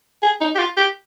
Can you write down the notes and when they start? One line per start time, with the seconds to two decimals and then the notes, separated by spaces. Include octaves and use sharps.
0.23 G#4
0.41 D#4
0.55 G4
0.59 F4
0.77 G4